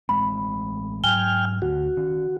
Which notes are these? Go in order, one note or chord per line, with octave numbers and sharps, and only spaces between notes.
A1 G#3 C4 B5
G#2 F#3 G5 G#5 F6 G7
D2 F#4
D#3 C#4